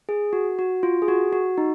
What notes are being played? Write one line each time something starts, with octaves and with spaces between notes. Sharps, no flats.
G#4
F#4
F#4
F4
G#4
F#4
F#4
D#4